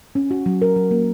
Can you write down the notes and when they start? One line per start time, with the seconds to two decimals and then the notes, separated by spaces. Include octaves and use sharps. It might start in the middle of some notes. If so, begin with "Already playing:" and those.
0.15 C#4
0.31 F#4
0.46 F#3
0.62 A#4
0.76 F#3
0.91 A#3